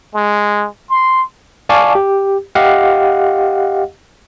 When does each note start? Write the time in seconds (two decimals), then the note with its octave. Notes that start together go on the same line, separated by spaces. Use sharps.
0.14 G#3
0.89 C6
1.69 D5 F5 G#5 A5 C#6 D6
1.95 G4
2.55 G4 D#5 F5 F#5